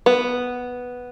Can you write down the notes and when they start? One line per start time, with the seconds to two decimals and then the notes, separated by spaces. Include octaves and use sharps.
0.06 B3